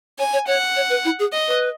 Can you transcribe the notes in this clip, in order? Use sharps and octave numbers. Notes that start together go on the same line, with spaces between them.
C#5 G#5
C#5
C#5 F#5
C#5
B4
E4
G#4
D#5
B4